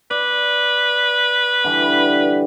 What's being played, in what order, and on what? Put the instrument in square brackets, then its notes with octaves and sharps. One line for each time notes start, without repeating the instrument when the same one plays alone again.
[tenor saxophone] B4 [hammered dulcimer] D5
[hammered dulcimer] D3 E3 G3